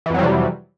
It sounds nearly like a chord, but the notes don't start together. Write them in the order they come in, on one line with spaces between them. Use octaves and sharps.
E3 F2 F#3 G3 C3